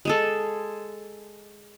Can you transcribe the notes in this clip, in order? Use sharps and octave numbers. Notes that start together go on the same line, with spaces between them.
G#3 G#4 A4